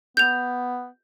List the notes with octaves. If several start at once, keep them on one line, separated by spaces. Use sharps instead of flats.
B3 G6 F7